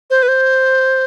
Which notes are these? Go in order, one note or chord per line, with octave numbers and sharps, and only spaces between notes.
C5
B4
C5